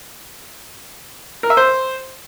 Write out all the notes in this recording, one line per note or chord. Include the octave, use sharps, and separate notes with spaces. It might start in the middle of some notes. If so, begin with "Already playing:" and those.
A#4
E5
C5